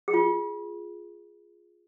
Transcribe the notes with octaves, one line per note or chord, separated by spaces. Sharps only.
G#4
F4